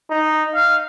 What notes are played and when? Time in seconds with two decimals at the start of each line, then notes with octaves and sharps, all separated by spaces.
0.10 D#4
0.55 F5